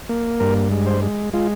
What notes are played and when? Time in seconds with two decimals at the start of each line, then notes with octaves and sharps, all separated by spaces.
0.09 A#3
0.40 G2 A#4
0.71 G#3
0.87 C5
1.02 G#3
1.33 G#3 F4